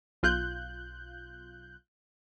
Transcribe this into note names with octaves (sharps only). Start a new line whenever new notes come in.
B1 F4 F#6 G6